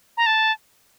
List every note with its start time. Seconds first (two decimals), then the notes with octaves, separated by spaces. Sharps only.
0.17 A#5
0.26 A5